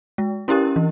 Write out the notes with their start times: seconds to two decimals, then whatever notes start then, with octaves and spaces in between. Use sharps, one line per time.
0.18 G#3
0.48 C#4 E4 G4 A#4
0.76 E3